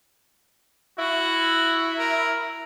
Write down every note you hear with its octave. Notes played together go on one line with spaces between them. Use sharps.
E4 F#4
A#4